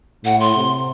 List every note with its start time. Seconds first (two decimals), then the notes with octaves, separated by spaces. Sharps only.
0.24 A2 F#5
0.40 C6
0.56 C3